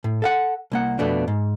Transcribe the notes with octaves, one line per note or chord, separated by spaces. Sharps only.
A2
A4 F5 F#5
C2 A#3 F#5
F2 B2 A3 B3 D4
G#2